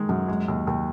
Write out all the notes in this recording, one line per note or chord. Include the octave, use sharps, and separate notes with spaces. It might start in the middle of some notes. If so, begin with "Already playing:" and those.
Already playing: D#3 G#3
F#2
G#3
D#2
D#2